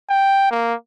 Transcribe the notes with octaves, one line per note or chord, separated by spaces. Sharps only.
G5
A#3